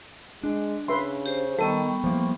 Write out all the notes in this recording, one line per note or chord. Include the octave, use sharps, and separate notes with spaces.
G#3 D4
C#3 B4 E5 C6
G4 C5
D#3 G3 B3 A4 C#6
E2 F3 A#3